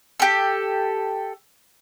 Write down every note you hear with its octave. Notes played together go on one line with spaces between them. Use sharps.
G4 A4